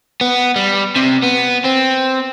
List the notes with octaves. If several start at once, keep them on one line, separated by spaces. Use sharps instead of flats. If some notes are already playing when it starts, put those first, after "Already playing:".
B3
G3
C3
B3
C4